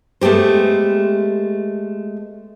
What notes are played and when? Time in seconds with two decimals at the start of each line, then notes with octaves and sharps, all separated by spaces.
0.21 G#3 A3 B3 G4 C5